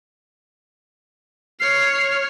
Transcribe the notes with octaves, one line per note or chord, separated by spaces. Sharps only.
C#5 F6 C7